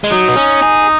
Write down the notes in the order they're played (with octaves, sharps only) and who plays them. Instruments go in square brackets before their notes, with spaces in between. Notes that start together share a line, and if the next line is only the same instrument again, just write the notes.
[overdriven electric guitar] G#3
[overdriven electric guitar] F#3 [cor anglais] D#4
[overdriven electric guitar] B3
C#4
G#4